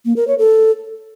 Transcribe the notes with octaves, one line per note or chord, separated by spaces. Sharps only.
A#3
A#4
C#5
A4